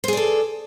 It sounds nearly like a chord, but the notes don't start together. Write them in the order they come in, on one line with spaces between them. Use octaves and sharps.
C5 G#4 D5 A4